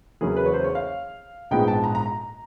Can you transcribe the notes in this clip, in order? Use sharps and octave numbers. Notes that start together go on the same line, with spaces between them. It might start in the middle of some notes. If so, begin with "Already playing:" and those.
E2 C#3 F#3 A#3 C#4 G#4
B4
C#5
C5
C#5
F5
A#1 G#2 F3 G#3 B3 G5
A5
A#5
A#5
A#5